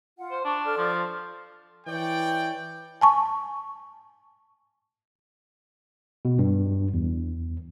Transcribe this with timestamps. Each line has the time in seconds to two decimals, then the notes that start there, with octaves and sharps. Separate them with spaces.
0.18 F4 F#5
0.31 C5
0.45 D4 C#6
0.65 A4 D5 F6
0.78 F3
1.87 E3 C#5 D5 G5
3.01 G#5 A5 C#6
6.25 B2
6.39 G2
6.94 E2